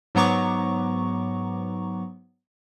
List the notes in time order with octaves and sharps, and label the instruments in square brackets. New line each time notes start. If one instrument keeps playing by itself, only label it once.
[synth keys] G#2 F#3 B3 A#5 C#6 D6